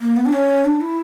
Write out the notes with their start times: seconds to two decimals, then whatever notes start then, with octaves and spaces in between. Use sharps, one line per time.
0.01 A#3
0.16 B3
0.26 D4
0.33 C#4
0.65 D4
0.81 E4